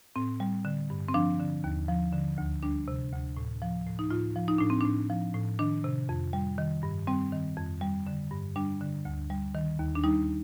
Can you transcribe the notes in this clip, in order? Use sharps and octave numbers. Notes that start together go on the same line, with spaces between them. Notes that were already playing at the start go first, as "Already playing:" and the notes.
A2 C4
G3
D3
G2
C4
F3 D4
D3
D#2
F3
D3
D2
G3 D4
C3
D2
A2
F3
A2
D#4
A2 F4
F3
D#4
A2 D4
C4
A2 D4
F3
A2
D#3 D4
C3
F2
G3
D#3
G2
G3 C4
D#3
F2
G3
D3
G2
G3 D4
D3
D2
G3
D#3
D#2
D4
G3 D#4